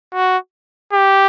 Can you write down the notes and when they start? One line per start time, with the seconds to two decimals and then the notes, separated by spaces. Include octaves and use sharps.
0.14 F#4
0.93 G4